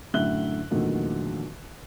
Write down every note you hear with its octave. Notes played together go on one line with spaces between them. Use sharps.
F#2 A2 D3 E5 F#6 G7
E2 A#2 D3 D#3 F#3 A3